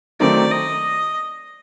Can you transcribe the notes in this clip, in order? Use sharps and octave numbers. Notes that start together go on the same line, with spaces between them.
D#3 F#3 A3 C4 D#4 D5
D#5